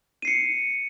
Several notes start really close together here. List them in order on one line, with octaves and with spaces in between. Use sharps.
D#7 C7 C#7